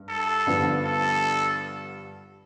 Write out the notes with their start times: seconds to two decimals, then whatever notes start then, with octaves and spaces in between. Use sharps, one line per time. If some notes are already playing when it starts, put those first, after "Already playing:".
Already playing: G2
0.09 A4
0.47 G2 D3 F3 B3 D4
0.84 A4